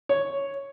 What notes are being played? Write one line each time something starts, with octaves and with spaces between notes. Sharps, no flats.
C#5